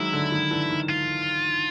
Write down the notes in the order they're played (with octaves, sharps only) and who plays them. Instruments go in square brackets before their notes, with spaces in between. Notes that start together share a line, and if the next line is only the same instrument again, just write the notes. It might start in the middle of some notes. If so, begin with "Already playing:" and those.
Already playing: [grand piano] D#3 F#3 G#3 [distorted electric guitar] E4
[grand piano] D3
D#3
D3 E3
D#3
[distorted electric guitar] F4